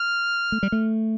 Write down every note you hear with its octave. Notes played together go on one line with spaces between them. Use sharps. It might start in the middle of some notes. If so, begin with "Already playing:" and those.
Already playing: F6
A3
G3
A3